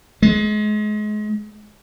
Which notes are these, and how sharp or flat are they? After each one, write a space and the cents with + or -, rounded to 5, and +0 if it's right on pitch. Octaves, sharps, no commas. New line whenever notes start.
G#3 +30